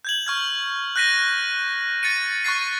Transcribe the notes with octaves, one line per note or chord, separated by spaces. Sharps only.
G6 G#6 F#7
C#6 F6 G#6
F#6 G6 A#6 B6 D#7
A6 C#7 D#7
C#6 F#6 A6 C7